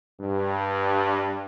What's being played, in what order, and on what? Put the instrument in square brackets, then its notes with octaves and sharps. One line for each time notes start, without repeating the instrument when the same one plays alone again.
[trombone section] G2